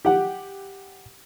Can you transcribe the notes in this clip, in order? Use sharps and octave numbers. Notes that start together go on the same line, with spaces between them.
G4 F#5